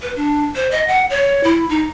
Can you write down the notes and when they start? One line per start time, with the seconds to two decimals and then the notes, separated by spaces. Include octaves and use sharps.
0.02 B4
0.16 D4
0.56 C5
0.71 D#5
0.87 F#5
1.10 C#5
1.44 E4
1.69 D#4